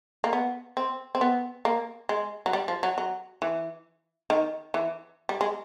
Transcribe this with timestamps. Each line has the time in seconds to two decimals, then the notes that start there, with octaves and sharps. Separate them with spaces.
0.24 A#3
0.33 B3
0.77 C4
1.15 C4
1.21 B3
1.65 A#3
2.09 G#3
2.46 F#3
2.53 G3
2.68 F3
2.83 F#3
2.98 F#3
3.42 E3
4.30 D#3
4.74 E3
5.29 G3
5.41 G#3